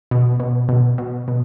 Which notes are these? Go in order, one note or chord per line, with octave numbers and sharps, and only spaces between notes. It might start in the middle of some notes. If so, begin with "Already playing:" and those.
B2
B2
B2
B2
B2